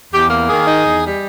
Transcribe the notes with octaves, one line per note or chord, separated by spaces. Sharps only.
E2 G4
A#3
D#3 G#4
D#4
E2
G3